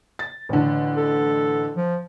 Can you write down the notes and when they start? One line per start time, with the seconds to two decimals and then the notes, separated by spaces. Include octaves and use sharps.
0.19 A6
0.49 A1 D3
0.97 A4
1.76 F3